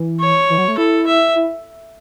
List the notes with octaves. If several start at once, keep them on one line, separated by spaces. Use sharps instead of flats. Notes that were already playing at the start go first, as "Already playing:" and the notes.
Already playing: E3
C#5
E3
F#3
A3
E4 A4
E5
E4